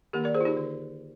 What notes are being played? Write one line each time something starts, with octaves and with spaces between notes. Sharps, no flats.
D#3 A#3 D4 G4 A#4
A#4 D5
G#4 C5
F4
D#4 G4
D3